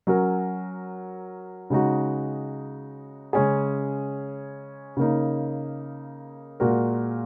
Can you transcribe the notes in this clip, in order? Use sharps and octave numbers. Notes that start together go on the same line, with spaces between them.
F#3 C#4 F#4 A#4
C#3 G#3 D#4 F#4
C#3 G#3 C#4 G#4
C#3 A#3 D#4
A#2 G#3 F#4 A#4